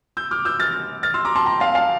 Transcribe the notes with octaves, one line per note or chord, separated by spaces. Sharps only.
E6 G6
D6 F6
E6 G6
F6 A6
F6 A6
C6 E6
A#5 D6
A5 C6
G5 A#5
F5 A5
F5 A5